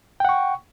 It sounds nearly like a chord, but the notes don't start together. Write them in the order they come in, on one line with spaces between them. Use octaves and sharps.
G5 F#5 C#6